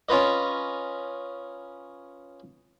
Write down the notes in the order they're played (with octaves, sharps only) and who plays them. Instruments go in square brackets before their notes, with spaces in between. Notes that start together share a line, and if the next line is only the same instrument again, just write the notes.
[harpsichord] C#4 F4 B4 D#5